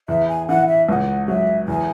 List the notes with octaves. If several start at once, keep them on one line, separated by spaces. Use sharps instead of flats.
E2 E5
G#5
E3 F#5
E5
C#2 F#5
F#3 E5
E2 G#5